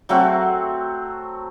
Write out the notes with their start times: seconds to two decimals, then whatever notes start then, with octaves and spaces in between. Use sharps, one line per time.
0.09 F#3 A3 C4 F#4